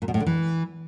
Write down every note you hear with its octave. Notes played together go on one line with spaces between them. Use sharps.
A#2
B2
A2
D3
E3